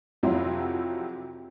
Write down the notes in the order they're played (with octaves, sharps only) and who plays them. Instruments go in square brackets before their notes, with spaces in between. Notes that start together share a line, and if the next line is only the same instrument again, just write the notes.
[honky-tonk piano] F2 C3 F#3 E4 F4